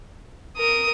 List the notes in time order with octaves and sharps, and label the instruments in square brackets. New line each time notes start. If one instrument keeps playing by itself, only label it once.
[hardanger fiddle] A#4 [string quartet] D#6